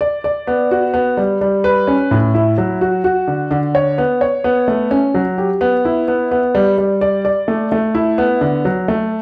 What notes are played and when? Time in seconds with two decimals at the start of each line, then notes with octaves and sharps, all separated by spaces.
0.01 D5
0.24 D5
0.47 B3
0.71 F#4
0.94 B3
1.17 G3
1.41 G3
1.64 B4
1.87 C#4
2.11 A2
2.35 E4
2.58 F#3
2.81 F#4
3.04 F#4
3.27 D3
3.51 D3
3.75 C#5
3.98 B3
4.21 C#5
4.44 B3
4.68 A3
4.91 C#4
5.14 F#3
5.38 G4
5.61 B3
5.85 E4
6.08 B3
6.31 B3
6.55 G3
6.78 G3
7.01 D5
7.25 D5
7.48 A3
7.72 A3
7.95 E4
8.18 B3
8.41 D3
8.65 F#3
8.88 A3